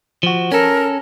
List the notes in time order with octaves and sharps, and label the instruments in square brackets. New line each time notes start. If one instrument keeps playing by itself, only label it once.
[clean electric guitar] F3 F#4
[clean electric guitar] C#4 A4 [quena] A#4